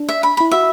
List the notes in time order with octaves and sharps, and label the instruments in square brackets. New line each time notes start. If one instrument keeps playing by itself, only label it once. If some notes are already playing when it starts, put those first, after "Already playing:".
Already playing: [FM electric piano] D4
[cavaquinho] E5
B5
[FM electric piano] E4 [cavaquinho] B5
[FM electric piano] F#4 [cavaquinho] E5